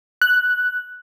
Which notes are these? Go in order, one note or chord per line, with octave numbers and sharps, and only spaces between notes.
F#6